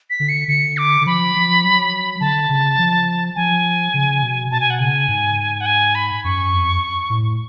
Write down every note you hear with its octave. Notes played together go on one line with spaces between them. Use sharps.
B6
D3
C#7
D3 C#7
D6
D3
F3 B5
F3
F#3
D3 A5
C#3
F3
F3 G#5
C#3
B2
B2 A5
G#5
F#5
C#3 G#5
G#2
F#5
G#5
B5
F#2 C#6
F2
A2